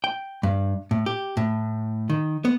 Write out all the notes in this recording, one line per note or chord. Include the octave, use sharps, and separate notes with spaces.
G5
G2
A2
G4
A2
D#3
B3